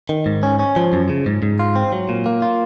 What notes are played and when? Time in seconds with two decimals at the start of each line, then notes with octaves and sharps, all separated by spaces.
0.09 D#3
0.26 G#2
0.43 C#4
0.59 C#4
0.76 F3
0.93 F#2
1.09 C#3
1.26 G#2
1.43 G#2
1.59 F4
1.76 C4
1.92 F#3
2.09 A#2
2.26 A#3
2.42 F4